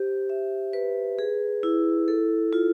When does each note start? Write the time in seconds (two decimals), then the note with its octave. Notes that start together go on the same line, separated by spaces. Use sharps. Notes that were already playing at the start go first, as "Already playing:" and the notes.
Already playing: G4 C5
0.30 E5
0.73 B4
1.19 G#4
1.63 E4
2.08 A4
2.53 F4